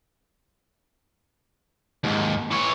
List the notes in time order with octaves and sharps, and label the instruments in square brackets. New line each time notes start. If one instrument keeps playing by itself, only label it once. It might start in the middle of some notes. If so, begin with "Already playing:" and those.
[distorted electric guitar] D#2 G#2
E3 C#5